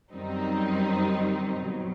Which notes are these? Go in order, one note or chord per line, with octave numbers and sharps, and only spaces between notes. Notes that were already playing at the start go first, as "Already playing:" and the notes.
F#2 D#3 G3 C4 D#4
B2 F#3